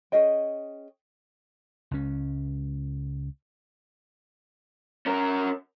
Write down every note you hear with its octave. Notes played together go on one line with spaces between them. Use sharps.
C#4 G#4 D#5 G5
C#2 C#4
C#4 A#4